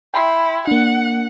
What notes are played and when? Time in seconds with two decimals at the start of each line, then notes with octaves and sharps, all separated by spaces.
0.14 E4 G5 B5 C6
0.67 A#3 D4 F#5